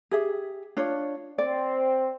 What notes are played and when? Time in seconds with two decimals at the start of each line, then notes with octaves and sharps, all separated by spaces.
0.11 G4 G#4 E5
0.77 D4 F4 C#5
1.38 C4 D5